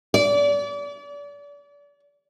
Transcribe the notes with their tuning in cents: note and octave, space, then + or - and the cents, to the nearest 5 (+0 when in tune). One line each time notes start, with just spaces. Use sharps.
D5 -35